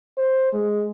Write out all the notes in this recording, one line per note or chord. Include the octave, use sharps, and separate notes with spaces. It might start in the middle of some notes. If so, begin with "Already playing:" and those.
C5
G#3